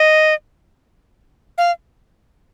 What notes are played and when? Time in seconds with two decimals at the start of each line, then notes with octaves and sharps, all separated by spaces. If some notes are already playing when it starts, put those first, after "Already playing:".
Already playing: D#5
1.58 F5